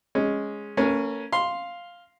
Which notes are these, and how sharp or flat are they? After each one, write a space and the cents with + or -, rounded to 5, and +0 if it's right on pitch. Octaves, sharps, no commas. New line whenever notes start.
G#3 +0 C#4 +0
A#3 -45 C#4 +0 A#4 +45
F5 +0 C6 +0